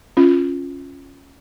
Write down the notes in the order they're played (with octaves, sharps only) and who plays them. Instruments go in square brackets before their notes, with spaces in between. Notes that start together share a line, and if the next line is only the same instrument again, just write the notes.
[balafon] C#4 F4